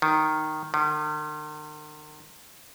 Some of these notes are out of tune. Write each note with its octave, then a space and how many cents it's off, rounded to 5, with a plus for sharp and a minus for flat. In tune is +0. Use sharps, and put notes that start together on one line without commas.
D#3 -5
D#3 -45